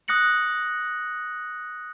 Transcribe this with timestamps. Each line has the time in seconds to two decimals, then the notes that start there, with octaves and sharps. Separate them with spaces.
0.08 D#6 F#6 A#6 C#7 F#7